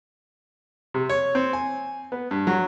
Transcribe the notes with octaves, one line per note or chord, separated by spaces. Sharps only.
C3
C#5
C4
G#5
B3
G2
F#3